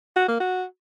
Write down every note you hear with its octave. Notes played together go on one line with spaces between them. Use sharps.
F#4
A#3
F#4